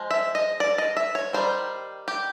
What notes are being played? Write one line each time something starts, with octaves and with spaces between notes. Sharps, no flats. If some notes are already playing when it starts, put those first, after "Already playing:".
Already playing: F3 G#3
E5
D#5
D5
D#5
E5
C#5
D#3 G3 C4 C5
G4